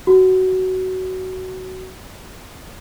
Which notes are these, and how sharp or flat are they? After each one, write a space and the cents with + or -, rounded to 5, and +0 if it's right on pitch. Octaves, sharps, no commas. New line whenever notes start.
F#4 +15